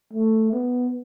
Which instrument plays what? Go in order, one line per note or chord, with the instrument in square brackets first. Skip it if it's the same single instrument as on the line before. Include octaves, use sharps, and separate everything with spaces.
[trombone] A3
B3